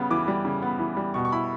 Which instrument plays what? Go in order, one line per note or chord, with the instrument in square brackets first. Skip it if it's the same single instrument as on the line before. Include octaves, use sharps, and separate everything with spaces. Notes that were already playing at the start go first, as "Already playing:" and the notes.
Already playing: [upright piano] C#3 G3 B3
E3 D6
G3
C#3
B3
E3
G3
B2 C#6
C#6
E4 B5